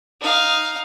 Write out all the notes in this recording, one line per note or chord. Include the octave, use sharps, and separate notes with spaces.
D#4 F5